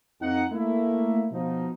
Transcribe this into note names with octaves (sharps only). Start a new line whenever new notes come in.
F2 D#4 F#5
A3 A#3 E4
B2 F3 D#4